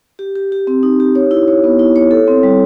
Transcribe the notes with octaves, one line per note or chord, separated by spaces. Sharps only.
G4
G4
G4
C4
D#4
G4
C#5
E4
C#5
B3
E4
C#5
A4
C4
G3